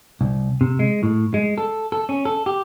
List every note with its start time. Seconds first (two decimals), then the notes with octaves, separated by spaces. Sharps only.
0.21 C2
0.61 C3
0.79 G#3
1.03 A2
1.34 G#3
1.58 A4
1.92 A4
2.09 C#4
2.25 A4
2.46 G4